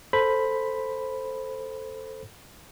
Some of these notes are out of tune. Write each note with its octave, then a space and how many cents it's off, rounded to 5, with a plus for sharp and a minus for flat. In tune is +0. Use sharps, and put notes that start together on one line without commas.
A4 +5 C5 +0 B5 +0